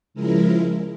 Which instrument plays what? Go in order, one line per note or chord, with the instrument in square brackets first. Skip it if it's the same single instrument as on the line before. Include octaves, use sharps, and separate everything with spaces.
[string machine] C#3 F3 G#3 E4 A#4